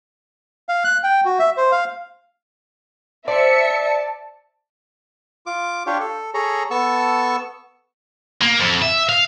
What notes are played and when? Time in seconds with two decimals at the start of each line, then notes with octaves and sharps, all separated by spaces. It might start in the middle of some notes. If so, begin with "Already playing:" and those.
0.69 F5
0.84 F#6
1.03 G5
1.25 F#4
1.39 E5
1.57 C5
1.72 F5
3.28 C5 D5 E5 A5 C#7
5.46 F4 D6
5.87 D4 F4 G4 C#5
6.00 A4
6.34 G#4 A4 C#5 A#5
6.71 B3 A4 A5 C#6 E6
8.42 A#3
8.59 F2
8.82 E5
9.09 F5